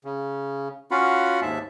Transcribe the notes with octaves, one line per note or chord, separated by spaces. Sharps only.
C#3
C#4 F4 F#4 F5 F#5 B5
D#2 G#2 E5 A5